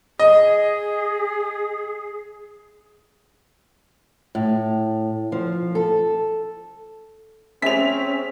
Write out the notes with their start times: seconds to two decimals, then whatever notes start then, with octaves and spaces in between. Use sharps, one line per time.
0.19 G#4 D#5
4.35 A2
5.32 F3
5.75 A4
7.62 C4 C#4 G#4 E5 B6 F7